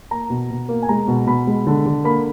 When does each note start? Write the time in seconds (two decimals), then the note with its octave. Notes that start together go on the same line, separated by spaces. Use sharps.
0.11 A#3 A#5
0.30 B2
0.50 B2
0.69 A#3
0.83 G#5
0.89 G#3 A#5
1.08 B2
1.27 B2 B5
1.47 G#3
1.67 D3
1.86 D3
2.04 A#3 B5